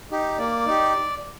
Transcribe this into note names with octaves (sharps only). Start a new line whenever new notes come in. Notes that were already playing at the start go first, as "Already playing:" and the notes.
D#4 G4
A#3 D5
D#4 G4